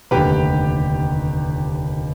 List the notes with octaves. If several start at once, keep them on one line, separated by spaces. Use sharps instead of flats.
F1 D#2 D3 G4 B4